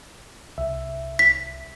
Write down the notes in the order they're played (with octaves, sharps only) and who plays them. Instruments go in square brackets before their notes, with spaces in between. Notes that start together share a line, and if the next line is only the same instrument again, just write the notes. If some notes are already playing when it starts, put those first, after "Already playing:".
[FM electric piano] C2 E5
[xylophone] B6